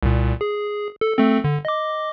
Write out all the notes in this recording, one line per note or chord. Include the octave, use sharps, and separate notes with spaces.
C2 A#2
G#4
A4
A3 C4 A4
D3
D#5 D6